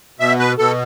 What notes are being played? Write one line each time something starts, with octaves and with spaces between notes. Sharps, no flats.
B2 E5
B4
B2 A4